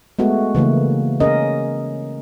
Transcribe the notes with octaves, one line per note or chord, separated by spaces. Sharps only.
G#3 A3 B3 F#4
C#3 E3 A3 A#3
C#4 G#4 A#4 D#5